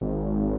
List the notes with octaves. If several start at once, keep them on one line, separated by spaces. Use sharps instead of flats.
G#1